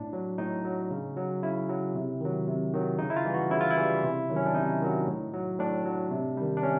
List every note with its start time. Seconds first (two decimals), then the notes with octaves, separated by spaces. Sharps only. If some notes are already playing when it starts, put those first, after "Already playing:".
Already playing: A2 D4
0.13 F#3
0.38 A2 D#4
0.65 F#3
0.91 C#3
1.16 F#3
1.43 C#3 E4
1.69 F#3
1.95 C3
2.21 D#3 F#3
2.47 C3
2.73 D#3 F#3
2.98 C#3 D#4
3.10 E4
3.16 F4
3.24 E3 G3
3.34 F#4
3.51 C#3 E4
3.61 F4
3.70 E4
3.77 E3 G3
4.03 C3
4.29 D#3 F#3
4.36 C#4
4.46 D4
4.55 C3 D#4
4.81 D#3 F#3
5.07 A2
5.34 F#3
5.59 A2 D4
5.85 F#3
6.11 C3
6.37 D#3 G3
6.57 D4
6.63 C3 C#4